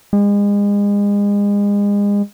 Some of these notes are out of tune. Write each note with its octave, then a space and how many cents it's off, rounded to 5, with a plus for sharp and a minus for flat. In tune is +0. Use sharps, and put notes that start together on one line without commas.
G#3 -35